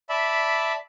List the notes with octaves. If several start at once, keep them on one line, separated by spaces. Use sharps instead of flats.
D5 E5 A5 B5